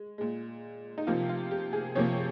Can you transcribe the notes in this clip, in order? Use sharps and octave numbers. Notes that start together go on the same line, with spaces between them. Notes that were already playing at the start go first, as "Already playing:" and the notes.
Already playing: G#3
A#2 G#3
D#4
C3 F3 A#3 F4
F4
G4
G#4
C3 F3 A#3 C#5